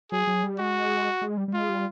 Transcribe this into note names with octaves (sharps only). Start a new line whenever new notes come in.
F#3 G#4
F#3
G3
G#3 F#4
G#3
G3
G3
G#3 F4
G3